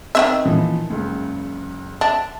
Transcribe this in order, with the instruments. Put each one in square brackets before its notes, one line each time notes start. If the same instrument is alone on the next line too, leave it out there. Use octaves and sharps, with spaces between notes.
[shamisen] D#3 C#4 E5 [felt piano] C4
[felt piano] A#2 E3 F3
F#1 C#2
[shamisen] D4 [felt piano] E5